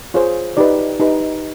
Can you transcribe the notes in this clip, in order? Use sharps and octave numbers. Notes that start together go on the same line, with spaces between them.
F4 G#4 C5 C#5
D#4 G4 B4 D5
D#4 G4 B4